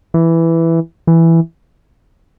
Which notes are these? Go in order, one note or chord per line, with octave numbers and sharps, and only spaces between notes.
E3
E3